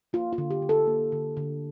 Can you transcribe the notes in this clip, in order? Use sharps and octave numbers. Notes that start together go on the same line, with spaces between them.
A#3 F4
F4
D3
G4
D3
A4
A#3
D3
D3